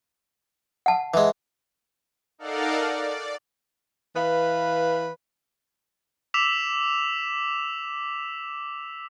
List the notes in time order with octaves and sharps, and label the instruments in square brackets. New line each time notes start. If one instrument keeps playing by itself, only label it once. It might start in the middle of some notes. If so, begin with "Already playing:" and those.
[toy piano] F#5 A5
[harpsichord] E3 G#3
[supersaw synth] D#4 A4 A#4 D5 F5 F#5
D5
[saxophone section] E3 B4 F5
[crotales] D6 E6 B6 E7 F7